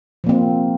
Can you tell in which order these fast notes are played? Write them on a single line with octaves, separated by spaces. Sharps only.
F3 A#3 C4